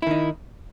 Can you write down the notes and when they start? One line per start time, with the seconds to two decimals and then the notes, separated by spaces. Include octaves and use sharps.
0.02 E4
0.07 D#3
0.11 D#4